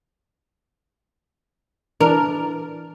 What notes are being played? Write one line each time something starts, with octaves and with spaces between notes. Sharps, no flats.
E3 D4 A#4